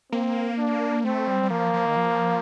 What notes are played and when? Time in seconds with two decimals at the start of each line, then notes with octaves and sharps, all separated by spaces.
0.12 A#3 C4
0.58 D4
1.04 A3 C4
1.27 G3
1.43 G3
1.50 F3 A#3
1.73 F3
1.86 D#3
1.96 F3